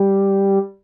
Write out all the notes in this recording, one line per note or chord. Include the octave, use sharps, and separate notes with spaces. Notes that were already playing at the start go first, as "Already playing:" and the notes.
Already playing: G3